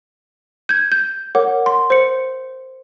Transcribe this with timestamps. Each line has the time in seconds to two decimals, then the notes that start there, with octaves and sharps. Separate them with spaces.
0.69 G6 G#6
0.92 G6
1.35 A#4 C#5 F#5 D6
1.66 C6
1.90 C5 C#7